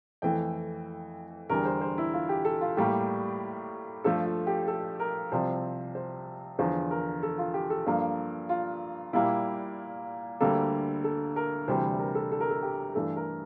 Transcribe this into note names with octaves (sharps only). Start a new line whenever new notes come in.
F2 E3 A3 G5
E2 D3 G3 A#4
C5
C5
E4
F4
G4
A4
F4
A2 G3 A#3 G4
G2 F3 A3 A4
F4
G4
A4
A#4
C2 C3 F3 C5
C5
E2 D3 F3 C5
A#4
A4
F4
G4
A4
G2 F3 A#3
F4
A#2 G3 A#3 E4
D2 D3 G3 A#3 A4
A4
A#4
D2 C3 E3 G3 C5
A#4
A4
A4
A#4
A4
G4
G2 E3 A3 A4
A#4